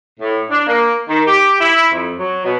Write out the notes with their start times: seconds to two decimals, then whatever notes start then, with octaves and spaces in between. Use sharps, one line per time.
0.19 A2
0.50 D4
0.66 A#3
1.08 D#3
1.26 G4
1.60 E4
1.92 F2
2.17 F#3
2.44 B2